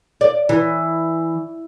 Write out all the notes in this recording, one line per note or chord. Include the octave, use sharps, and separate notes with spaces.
D5
E3